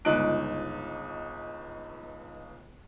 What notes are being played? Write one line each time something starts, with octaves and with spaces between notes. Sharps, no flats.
G1 C#2 D#4 D#6 F#6 D7